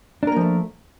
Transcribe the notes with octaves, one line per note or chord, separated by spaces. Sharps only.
F3 A3 A#3 D4 A#4